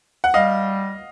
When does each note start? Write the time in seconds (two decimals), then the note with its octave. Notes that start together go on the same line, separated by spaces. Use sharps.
0.24 F#5
0.34 G3 D#5 F5